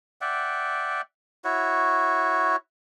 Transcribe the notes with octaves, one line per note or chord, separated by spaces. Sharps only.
D5 E5 F#5 G5
E4 F#4 C#5